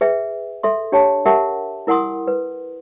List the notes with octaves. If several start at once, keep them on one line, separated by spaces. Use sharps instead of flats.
G#4 B4 E5 G5
A4 E5 C6
D4 G4 C#5 G5 A5
G4 A#4 E5 F#5 A5
E4 A#4 F#5 G#5 C6 D#6
B4